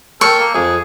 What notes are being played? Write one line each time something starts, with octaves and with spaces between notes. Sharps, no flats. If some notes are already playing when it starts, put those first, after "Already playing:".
A4 A#4 C#5 G5 C#6
A#3
F2 G#4